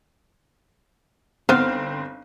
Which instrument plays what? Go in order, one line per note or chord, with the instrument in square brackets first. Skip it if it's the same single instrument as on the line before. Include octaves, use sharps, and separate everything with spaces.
[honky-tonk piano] G1 C4 [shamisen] B3 D#4 C5 [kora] F5